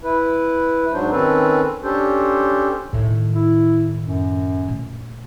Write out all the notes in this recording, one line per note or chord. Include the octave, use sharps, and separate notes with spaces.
E4 B4
G#2 F#3 D4 C5
D#3 C4 C#4 A4 B4
C#4 D4 G4 A4 C5
A2 D#3
E4
F#2
A#2 A3